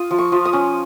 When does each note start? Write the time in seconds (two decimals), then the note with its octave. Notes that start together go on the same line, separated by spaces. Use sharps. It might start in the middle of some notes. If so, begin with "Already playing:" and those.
Already playing: F4 D#6
0.11 F3
0.18 C#6
0.32 F3
0.45 D#6
0.53 C#4